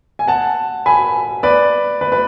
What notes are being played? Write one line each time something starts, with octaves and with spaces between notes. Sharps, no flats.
G#5
F#5 A5
G#5 B5
B4 D5
B4
B4